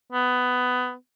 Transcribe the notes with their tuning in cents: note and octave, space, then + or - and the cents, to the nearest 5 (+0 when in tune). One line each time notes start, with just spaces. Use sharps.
B3 +15